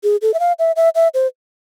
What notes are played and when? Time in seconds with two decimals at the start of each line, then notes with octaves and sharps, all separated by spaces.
0.04 G#4
0.22 A4
0.34 E5
0.40 F5
0.59 E5
0.76 E5
0.95 E5
1.14 C5